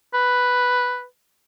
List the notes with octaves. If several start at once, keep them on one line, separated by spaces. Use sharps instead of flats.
B4